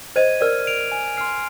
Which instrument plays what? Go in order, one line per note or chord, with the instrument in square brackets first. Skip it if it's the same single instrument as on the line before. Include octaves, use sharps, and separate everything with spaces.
[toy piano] C5 D#5 [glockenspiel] G#6 D#7
[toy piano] A#4 D5 [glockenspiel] F6
[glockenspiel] G#6 D7 F7
G#5
C6 F6 C7